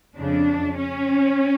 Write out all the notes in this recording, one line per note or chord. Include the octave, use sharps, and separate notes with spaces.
F2 C#3 D4
C#4